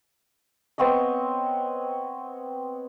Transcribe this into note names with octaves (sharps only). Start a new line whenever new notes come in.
B3 C4 C#5 D#5